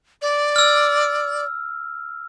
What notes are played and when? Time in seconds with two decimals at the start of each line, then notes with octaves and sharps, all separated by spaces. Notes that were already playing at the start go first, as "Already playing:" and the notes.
0.22 D5
0.56 E6 F6